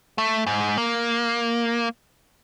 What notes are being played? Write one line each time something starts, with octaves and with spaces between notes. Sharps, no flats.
A3
G#2
A#3